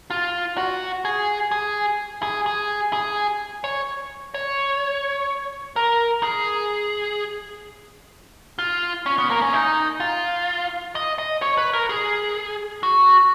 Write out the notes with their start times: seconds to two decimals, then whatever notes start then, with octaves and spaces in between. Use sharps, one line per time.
0.10 F4
0.57 F#4
1.05 G#4
1.51 G#4
2.23 G#4
2.46 G#4
2.93 G#4
3.64 C#5
4.34 C#5
5.76 A#4
6.23 G#4
8.59 F4
9.06 C#4
9.18 B3
9.30 A#3
9.42 C#4
9.53 D#4
10.00 F4
10.95 D#5
11.18 D#5
11.42 C#5
11.57 B4
11.73 A#4
11.89 G#4
12.83 F#4